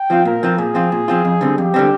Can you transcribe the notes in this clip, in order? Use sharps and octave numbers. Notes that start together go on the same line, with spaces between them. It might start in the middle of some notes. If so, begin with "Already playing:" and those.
Already playing: G5
F3 C4 F4
A#2 A#4
F3 C4 F4
A#2 G#4
F3 C4 F4
A#2
F3 C4 F4
F2
D3 G3 C4
F2 G4
D3 G3 C4